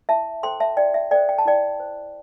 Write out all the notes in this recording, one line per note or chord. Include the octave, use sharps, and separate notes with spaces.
E4 E5 A5
A4 C5 G5 C6
E5 A5
E4 D5 G5
E5
A4 C5 D5 G5
G5
A5
E4 D5 G5
C5